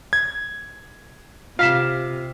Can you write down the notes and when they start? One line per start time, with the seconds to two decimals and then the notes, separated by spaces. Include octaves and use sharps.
0.13 G#6
1.59 C3 F4 F5 B6 E7